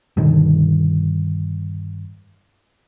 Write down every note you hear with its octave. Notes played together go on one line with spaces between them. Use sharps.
G2 B2 D3 D#3